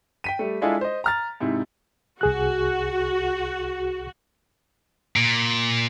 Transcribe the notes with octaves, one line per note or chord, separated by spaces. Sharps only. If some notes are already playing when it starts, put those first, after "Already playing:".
G5 B6 D#7
G3 A3
G#3 D4 E4 F4 G#4 A4
C5 D#5
A#5 F6 A6
G#2 C3 E4
C2 F#4 G#4 F#6
A#2